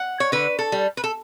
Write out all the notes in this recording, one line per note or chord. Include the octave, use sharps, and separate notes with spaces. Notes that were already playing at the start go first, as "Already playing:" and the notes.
Already playing: F#5
C#5
D3 B4
A4
G3
B4
A4